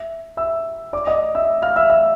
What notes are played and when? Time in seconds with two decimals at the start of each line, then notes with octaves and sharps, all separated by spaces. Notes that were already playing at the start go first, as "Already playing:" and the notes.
Already playing: E5
0.37 E5 E6
0.93 D5 D6
1.07 D#5 D#6
1.35 E5 E6
1.62 F5 F6
1.76 E5 E6
1.90 E5 E6